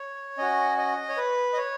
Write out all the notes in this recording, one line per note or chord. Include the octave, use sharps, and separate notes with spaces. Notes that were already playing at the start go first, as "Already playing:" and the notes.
Already playing: C#5
C#4 F#4 D#5
D#5
C#5
B4
D#5
C#5